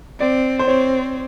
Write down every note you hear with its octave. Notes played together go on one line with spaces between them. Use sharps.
C4 D5
C5
C4 C#5